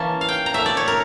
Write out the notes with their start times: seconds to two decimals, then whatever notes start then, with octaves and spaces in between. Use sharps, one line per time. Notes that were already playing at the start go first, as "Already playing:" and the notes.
Already playing: E3 A#3 C#4 A5
0.21 F5
0.29 G5
0.46 A#5
0.54 A#2 A3 C#4 E5
0.66 D5
0.77 C#5
0.88 A#4